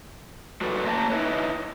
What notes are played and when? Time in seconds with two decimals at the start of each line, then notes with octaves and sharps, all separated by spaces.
0.61 F#3 G3 F#4 A4 B4
0.85 F#3 A3 A#3 F5 A5 A#5
1.10 D#4 E4 A#4 B4 C#5